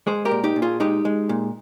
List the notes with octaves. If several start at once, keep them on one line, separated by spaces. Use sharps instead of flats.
G#3 G#4 C5
G4 A#4
A#2
D#4 G4
A#2
F4 G#4
G#3 D#4 G4
G#3
A#2